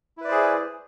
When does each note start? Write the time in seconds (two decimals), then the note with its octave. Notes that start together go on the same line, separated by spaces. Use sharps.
0.17 E4
0.21 B4
0.24 D5
0.28 C5
0.31 G#4